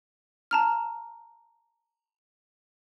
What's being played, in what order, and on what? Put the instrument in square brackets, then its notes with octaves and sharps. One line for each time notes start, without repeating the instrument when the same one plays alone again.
[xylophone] A5 A#5 F6